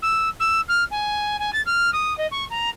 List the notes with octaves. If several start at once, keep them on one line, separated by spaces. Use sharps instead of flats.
E6
E6
F6
G#5
G#5
A6
F6
D#6
D#5
C#6
A#5